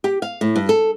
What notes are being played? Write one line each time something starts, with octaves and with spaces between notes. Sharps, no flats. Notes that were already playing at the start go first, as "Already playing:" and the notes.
G4
F5
A2
G2
A4